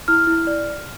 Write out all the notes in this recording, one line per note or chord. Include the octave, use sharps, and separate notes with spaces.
E4 F6
E4
D5